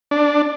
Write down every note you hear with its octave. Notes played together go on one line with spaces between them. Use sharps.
D4